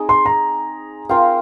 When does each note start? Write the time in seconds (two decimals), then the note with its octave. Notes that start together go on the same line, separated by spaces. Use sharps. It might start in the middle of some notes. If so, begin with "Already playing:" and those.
Already playing: C4 D#4 G#4
0.09 C6
0.26 A#5
1.09 C4 F4 A#4 F5 G5